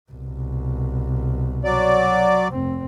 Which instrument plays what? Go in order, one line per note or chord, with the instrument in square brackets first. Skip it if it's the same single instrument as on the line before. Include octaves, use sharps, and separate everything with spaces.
[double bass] C2 B2
[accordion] F#3 D5
[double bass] F1 C4